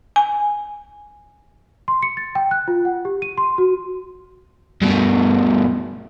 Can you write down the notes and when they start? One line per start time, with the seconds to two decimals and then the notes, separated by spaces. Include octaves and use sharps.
0.16 G#5
1.88 C6
2.02 C#7
2.17 A6
2.35 G5
2.51 F#6
2.68 F4
2.85 F#5
3.05 G4
3.22 D#7
3.38 C6
3.58 F#4
4.81 G2 B2